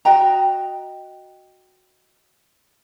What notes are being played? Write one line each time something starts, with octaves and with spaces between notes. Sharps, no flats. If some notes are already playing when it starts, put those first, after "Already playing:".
F#4 D#5 G5 A#5